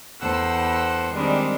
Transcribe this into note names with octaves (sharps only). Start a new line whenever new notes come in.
E2 A4 C5 F#5 G5 E6
D#3 G3 G#3 C4 D4